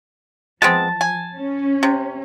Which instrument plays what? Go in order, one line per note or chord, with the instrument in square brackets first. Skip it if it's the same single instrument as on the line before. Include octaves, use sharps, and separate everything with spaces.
[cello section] F3 [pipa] G#3 B3 C4 [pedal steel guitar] A5
[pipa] G#5
[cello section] C#4
[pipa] C3